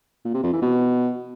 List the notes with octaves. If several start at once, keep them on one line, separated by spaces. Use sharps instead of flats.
A#2
C3
F2
E3
B2